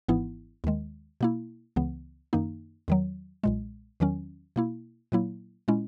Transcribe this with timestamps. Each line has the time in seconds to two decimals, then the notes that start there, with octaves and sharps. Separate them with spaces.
0.08 G#1 G#2 E3 B3 E4
0.64 D#2 D#3 G#3
1.21 B2 A#3 E4
1.76 C#2 C#3 E3 B3
2.33 F#2 D#3 A#3 D#4
2.88 E2 D#3 F#3
3.43 B1 A#2 G#3
4.00 E2 D#3 F#3 C#4
4.56 B2 A#3 E4
5.12 A#2 F#3 A#3 E4
5.68 A#2 G#3 C#4 E4